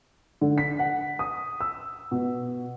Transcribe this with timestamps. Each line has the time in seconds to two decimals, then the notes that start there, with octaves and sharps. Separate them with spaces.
0.41 D3
0.58 B6
0.79 F#5
1.19 D#6
1.60 E6
2.11 B2